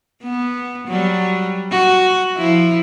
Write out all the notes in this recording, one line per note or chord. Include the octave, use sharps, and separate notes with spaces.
B3
F#3 G3
F#4
F3 E4